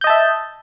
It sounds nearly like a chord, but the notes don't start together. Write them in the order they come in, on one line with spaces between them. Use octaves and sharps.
G6 D#5 A5 E5